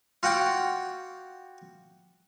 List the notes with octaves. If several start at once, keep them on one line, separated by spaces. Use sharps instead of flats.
F4 F#4 F#5 G5 D6